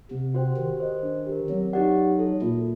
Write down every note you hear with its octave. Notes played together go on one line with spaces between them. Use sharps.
C3 C4
F#4 C5 G5
D#3 G4
C5 D#5
D4
G4 A#4
F#3 C4
D#4 G4 D5 F#5
D#4
F#4 A4
A#2 A#3